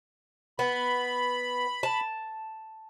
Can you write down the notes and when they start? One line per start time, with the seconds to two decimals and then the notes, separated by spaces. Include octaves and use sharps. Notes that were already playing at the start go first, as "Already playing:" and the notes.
0.59 B3 B5
1.83 A5